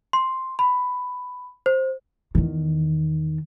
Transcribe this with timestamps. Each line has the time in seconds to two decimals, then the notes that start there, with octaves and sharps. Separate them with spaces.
0.13 C6
0.59 B5
1.66 C5
2.35 E2 D#3